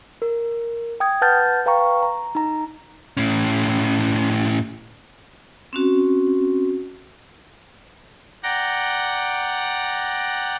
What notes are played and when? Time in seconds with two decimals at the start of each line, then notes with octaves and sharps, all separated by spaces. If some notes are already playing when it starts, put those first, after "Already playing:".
0.22 A#4
1.00 G5 D#6 G#6
1.22 B4 F#5 A5 F6 G6 A6
1.66 B4 F5 G5 A#5 C#6
2.03 A#5
2.35 D#4 A#5
3.17 A2 C#4
5.73 C4 C#4 F#4
8.43 D5 F#5 G5 A#5 A#6